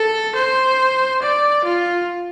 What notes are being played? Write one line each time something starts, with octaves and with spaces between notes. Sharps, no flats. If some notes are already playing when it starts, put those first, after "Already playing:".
Already playing: A4
C5
D5
F4